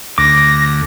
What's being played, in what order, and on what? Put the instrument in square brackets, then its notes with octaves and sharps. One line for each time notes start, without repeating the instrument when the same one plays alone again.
[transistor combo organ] D2 [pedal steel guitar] D6 [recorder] A#6